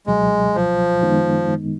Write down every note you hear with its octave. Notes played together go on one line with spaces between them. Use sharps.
C#2 B2 F#3 G#3
F3
F#2 D#3 G#3 B3 D#4